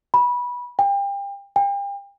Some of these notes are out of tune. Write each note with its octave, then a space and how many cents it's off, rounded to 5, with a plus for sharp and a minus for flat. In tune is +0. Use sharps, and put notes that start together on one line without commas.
B5 -20
G5 +30
G5 +35